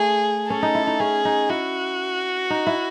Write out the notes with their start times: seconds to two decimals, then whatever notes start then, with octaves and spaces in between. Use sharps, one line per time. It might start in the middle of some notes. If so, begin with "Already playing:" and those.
Already playing: A3 G#4
0.49 C#4 A4
0.63 D#4
0.75 E4
0.87 D#4
1.00 C#4 G#4
1.25 D#4
1.50 E4 F#4
2.50 D#4
2.67 E4